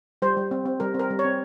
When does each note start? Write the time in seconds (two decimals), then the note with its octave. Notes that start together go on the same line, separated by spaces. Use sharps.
0.22 G3 C5
0.37 G3
0.51 C4
0.66 C4
0.80 G3 A#4
0.94 C4
0.99 A#4
1.10 G3
1.19 C#5
1.25 C4